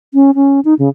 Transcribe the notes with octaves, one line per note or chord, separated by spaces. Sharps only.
C#4
C#4
D#4
C#3